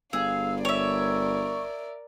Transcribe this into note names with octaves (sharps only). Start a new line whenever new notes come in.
G1 G#4 F5 E6
A#4 C#5 D5 E5 C#6